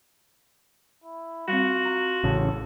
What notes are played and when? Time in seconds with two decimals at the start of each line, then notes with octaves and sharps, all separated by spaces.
1.04 E4
1.48 G3 C4 F4 F#4
1.85 A#5
2.24 A1 C#3 A4